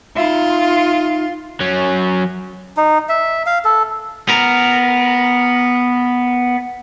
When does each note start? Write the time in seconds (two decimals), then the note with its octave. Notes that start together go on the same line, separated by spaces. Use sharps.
0.16 D#4 F4 E5
1.60 F#3 C#4
2.77 D#4
3.09 E5
3.46 F5
3.65 A4
4.29 B3 A#4